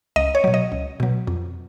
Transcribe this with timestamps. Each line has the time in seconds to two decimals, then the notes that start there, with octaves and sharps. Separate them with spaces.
0.16 C#2 D#5
0.35 C#5
0.44 B2 F#3
0.54 D#5
0.72 C#2
1.00 B2 F#3
1.27 F2